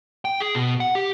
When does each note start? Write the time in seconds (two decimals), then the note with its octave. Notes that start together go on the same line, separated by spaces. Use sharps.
0.25 G5
0.40 G#4
0.55 B2
0.80 F#5
0.95 G4